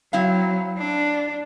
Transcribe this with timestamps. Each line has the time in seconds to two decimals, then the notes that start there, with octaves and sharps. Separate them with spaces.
0.13 F#3 C4 E4 F5
0.78 D4